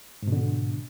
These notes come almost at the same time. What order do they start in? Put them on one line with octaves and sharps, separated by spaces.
G#2 B2 D3